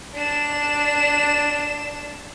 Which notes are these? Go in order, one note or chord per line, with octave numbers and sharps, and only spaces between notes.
D4 E7